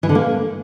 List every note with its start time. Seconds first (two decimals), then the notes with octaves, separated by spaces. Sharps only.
0.03 E3
0.09 D3
0.15 A#3